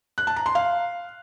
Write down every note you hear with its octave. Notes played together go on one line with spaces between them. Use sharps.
F#6
A5
A#5
C6
F5